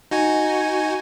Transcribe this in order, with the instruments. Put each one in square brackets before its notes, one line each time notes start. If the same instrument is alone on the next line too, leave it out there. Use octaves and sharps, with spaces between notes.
[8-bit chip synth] D#4 F#4 G#5